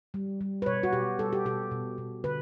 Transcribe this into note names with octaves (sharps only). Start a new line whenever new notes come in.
G3
G3
B4
B2 C#5
F#4
B2 G4
G3 A4
G4
B2 A4
B2
B2
D3 B4